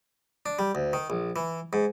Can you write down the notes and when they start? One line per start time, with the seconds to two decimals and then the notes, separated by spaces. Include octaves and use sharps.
0.46 D4
0.59 G3
0.75 D2
0.93 D#3
1.10 A#1
1.36 E3
1.73 G#2